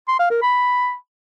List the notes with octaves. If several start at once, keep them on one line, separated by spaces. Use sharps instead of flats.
C6
F5
A#4
B5